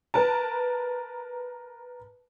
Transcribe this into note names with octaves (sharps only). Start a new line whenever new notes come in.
A#4 B4 A5